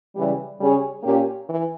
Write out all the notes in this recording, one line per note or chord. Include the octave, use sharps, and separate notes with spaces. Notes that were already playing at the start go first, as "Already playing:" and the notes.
C#3 E3 G3
C#3 G3 C#4 G#4 C#5
A#2 A#3 C#4 G4
E3